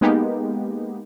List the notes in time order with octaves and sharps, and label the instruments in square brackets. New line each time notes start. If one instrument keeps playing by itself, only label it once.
[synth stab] G#3 A#3 B3 D#4 G4